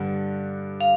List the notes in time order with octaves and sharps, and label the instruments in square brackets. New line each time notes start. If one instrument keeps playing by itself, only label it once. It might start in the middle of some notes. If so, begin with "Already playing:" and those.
Already playing: [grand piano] G2 D3 G3
[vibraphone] F5